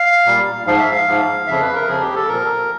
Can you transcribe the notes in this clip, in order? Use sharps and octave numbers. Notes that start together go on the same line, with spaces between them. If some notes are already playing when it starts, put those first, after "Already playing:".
Already playing: F5
A#2 G3
G#2 F3 F5
E5
F5
G#2 F3
F2 C#3 F3 E5
B4
A#4
F2 C#3 F3 G#4
G4
A4
A#2 F3 A#4